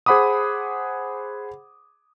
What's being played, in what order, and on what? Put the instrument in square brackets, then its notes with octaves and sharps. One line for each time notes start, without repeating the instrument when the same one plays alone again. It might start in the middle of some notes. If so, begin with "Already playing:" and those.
[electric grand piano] G#4 C5 F#5 B5 D6 D#6